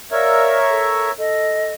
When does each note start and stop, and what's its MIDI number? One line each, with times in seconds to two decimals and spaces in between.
0.12 1.11 70
0.12 1.11 73
0.12 0.59 74
0.12 1.11 76
0.12 0.59 77
0.12 0.59 88
0.69 1.10 69
1.17 1.73 69
1.17 1.73 75